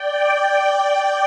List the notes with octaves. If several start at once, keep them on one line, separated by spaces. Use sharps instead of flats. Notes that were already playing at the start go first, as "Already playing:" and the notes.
Already playing: D5 G5